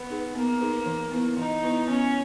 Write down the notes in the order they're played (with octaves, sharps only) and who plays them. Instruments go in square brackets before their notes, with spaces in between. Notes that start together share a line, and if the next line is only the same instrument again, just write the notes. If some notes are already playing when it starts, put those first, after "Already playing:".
Already playing: [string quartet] B3
[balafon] D#4 G#4 B4
[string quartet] A#3 [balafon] B3
[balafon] D#4 G#4 B4
E3
B3 E4 B4
[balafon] E3 [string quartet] D#4
[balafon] B3 E4 B4
[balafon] B3 [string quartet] C#4